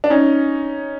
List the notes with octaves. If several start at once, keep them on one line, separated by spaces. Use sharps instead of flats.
D4
C#4 D#4